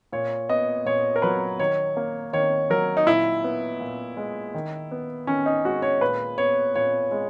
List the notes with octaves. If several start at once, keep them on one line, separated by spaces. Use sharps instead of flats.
A#2 C#5
B3 D#5
A#2 C#5
A#4
F#3 B4
D#3 C#5
A#3
D#3 C#5
F#3 A#4
D#4
A#2 E4
B3
A#2
G#3
D#3
B3
D#3 C#4
D#4
G#3 F#4
C#5
A#2 B4
B3 C#5
A#2 C#5
G#3